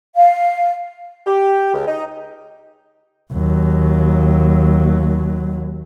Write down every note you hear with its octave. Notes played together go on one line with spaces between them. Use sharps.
F5
G4
C#2
D#4
D#2 F#3